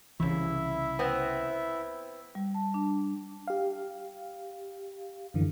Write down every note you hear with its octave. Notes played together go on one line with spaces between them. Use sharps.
C2 C#3 E3 E4 E5
B3 C4
G3
A5
D4
G4 F5
F#2 D3 E3